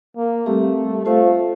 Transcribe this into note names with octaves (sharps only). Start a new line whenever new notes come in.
A#3
G3 A3 C4 G4
A3 F4 C5 F5